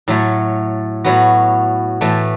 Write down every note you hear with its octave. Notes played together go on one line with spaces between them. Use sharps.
A2 F#3 A3
A2 F#3 B3 F#4
A2 E3 A3